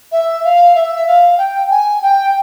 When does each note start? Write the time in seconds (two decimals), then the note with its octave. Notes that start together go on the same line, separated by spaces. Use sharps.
0.12 E5
0.44 F5
0.75 E5
1.07 F5
1.38 G5
1.70 G#5
2.02 G5